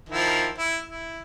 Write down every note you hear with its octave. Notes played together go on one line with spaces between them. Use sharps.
D#3 F3 E4
E4
E4